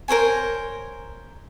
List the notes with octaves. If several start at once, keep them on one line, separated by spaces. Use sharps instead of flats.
A#4 C5 C#5 G#5